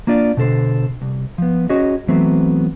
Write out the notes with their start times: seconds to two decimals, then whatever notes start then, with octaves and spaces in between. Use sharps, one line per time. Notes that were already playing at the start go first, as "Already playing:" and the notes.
0.07 A#3 D4 F4 D5
0.37 B2 D3 A4 C5
1.02 C2
1.38 F3 B3
1.69 C#4 F#4 G#4 C#5 D#5
2.08 E3 F#3 A3 B3 C4